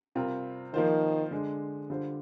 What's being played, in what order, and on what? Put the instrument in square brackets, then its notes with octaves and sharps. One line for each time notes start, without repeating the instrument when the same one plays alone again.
[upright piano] C3 G3 C4 F4 A#4
[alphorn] D#3 [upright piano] F3 A#3 F4 C5
[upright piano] D3 G#3 D4
D3 G3 D4 F4 C5